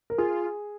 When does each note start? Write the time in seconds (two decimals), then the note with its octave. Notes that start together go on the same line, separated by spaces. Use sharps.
0.10 A#4
0.18 F4 G#4